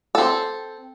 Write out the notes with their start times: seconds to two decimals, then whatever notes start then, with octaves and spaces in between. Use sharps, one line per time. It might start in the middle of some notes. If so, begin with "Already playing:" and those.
0.15 C4 A4